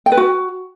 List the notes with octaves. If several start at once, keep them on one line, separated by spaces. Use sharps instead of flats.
G5
B4
F#4